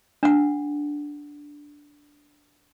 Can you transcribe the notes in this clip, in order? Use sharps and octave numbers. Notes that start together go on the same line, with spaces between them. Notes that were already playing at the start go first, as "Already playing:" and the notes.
D4 F#5